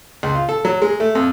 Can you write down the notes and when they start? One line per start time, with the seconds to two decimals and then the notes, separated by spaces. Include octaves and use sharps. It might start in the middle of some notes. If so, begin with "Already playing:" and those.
0.23 C#2
0.35 F4
0.49 A4
0.65 F#3
0.82 G#3
1.00 A3
1.15 F2